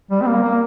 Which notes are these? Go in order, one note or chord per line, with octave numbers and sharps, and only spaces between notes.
G3
C4
A#3
A#3